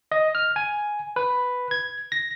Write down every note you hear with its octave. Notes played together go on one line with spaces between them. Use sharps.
D#5
F6
G#5
B4
G#6
A#6